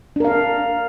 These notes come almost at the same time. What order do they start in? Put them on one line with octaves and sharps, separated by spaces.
D4 A#4 F5